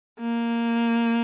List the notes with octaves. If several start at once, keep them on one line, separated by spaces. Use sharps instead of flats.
A#3